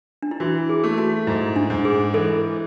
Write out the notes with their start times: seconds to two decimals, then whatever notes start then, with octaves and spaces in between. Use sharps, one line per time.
0.22 D4
0.31 E4
0.40 E3 F#4
0.69 G#4
0.84 A3
0.98 F#4
1.27 G#2 E4
1.56 D4
1.70 G#2
1.85 G#4
2.13 E3 A4